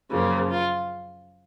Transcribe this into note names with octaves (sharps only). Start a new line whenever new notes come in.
F#2 C#3 F3 A#3
F4